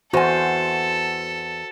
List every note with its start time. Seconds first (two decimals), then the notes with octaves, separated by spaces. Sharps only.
0.13 E2 F#4 A4 C5 G#5